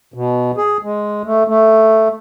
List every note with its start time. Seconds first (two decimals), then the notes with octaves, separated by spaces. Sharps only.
0.14 B2
0.57 G#4
0.83 G#3
1.25 A3
1.48 A3